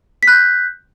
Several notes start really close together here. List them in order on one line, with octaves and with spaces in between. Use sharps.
B6 F#6 G6